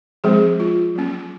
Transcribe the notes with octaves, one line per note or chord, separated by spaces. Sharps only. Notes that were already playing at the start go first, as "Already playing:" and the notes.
F3 G#3 C4 G#4
F4
F#3 A#3 C#4